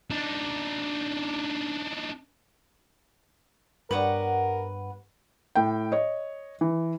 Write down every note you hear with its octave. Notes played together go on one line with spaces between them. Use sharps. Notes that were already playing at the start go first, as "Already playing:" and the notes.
D4 D#4
G2 G3 B3 A#4 B4 C#5 F#5
A2 G5
C#5 D#5
E3